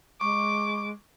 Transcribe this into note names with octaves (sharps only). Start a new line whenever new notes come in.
G#3 C#6 D6